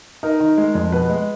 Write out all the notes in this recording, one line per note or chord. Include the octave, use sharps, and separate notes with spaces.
D#4 A#4
D#3
G#3
F2
B2 B4
G#3